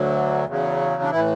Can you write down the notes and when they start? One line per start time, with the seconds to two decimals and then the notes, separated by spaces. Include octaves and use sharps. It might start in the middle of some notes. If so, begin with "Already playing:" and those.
Already playing: D2 D3 F#3
0.45 E2 C#3 F#3
1.02 D4
1.10 A2 E3 E4